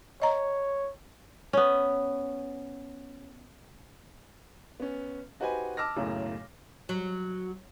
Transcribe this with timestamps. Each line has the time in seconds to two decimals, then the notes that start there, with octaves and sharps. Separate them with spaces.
0.22 C#5 D#5 A#5
1.53 B3 C#4
4.80 B3 C#4
5.40 D#4 F#4 G4 B4 C5 G#5
5.77 A5 D6 E6 F6 A#6
5.96 F#1 B1 F#2 A2 C#3
6.89 F#3